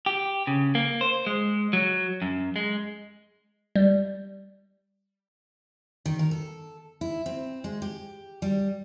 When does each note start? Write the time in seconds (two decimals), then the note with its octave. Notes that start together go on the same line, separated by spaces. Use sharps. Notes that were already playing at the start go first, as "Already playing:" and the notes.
0.06 G4
0.47 C#3
0.75 A#3
1.01 C5
1.27 G#3
1.73 F#3
2.22 F#2
2.56 G#3
3.76 G3
6.06 D#3
6.19 A#4
6.31 A4
7.01 E4
7.26 C4
7.64 G#3
7.82 G4
8.42 G3